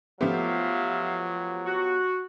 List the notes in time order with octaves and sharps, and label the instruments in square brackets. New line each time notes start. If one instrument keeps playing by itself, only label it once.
[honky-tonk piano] F3 A3 [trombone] F#3 [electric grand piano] B3 F4 G4 [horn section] E5 F5
[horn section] F#4